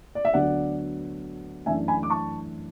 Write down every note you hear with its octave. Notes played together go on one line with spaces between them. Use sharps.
D5
E5
D2 D3 F#3 B3 D4 D5 F#5
F#2 E3 A3 D4 E5 G#5
G#5 B5
D6
A5 C#6